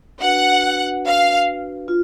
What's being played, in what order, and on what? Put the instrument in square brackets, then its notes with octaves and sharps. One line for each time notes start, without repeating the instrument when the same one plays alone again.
[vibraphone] D4 F#4 B4 [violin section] F#5
[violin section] F5
[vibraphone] F4